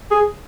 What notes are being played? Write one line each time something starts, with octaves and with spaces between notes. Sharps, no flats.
G#4